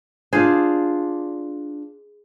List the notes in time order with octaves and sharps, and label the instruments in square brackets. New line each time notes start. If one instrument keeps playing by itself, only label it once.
[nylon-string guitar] D4 F4 [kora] G#4 C5